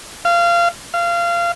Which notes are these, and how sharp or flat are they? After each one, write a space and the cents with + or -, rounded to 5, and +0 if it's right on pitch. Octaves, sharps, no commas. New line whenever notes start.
F5 -25
F5 -25